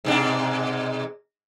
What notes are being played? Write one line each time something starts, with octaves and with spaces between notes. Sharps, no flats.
G#2 B2 D4